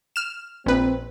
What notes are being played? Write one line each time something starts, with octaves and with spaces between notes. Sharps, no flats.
F6 E7
A#1 C4 B4